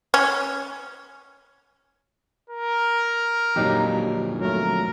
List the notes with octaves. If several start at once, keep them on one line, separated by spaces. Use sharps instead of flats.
C#4
A#4
F2 A#2 F#3 D#4 G4
F#3 A3 A#4